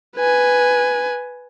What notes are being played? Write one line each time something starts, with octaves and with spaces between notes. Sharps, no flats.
B4 G#5